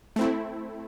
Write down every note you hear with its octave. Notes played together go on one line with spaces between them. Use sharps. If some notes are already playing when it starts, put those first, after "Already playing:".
A3 C4 E4